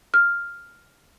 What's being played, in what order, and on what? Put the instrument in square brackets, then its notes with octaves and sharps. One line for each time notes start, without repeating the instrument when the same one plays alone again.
[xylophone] F6